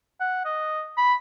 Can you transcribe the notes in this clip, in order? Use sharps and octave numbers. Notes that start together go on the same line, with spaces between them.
F#5
D#5
B5